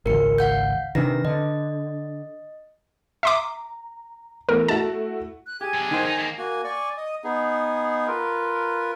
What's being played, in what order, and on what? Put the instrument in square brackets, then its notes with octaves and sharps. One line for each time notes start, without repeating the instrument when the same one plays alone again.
[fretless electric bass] G#1 C#2 [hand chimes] A#4 C#7
[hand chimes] F5 F#5 G6
[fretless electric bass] C3 D#3 [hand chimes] D4 B4 A#6
[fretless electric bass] D3 [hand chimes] D#5
[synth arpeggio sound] E5 C6 D6 [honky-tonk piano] A#5
[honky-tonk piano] E3 A3 B3 [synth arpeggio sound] A#4
[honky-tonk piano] A3 E4 F#4 [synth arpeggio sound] A5
[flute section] F#6
[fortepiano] G4 [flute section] G#4 G#5 G#6
[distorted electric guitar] B1 D3
[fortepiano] D#3 C5
[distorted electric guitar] D#4
A3 A#3
[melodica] A#3 F#4 G#5
D5 G#5 C#6
D#5 D#6
B3 D#4 G#4
F4 A#4 B4